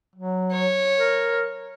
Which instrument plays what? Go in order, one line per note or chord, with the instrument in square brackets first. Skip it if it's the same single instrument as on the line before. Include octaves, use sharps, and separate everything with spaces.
[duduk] F#3
[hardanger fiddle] C#5
[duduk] A#4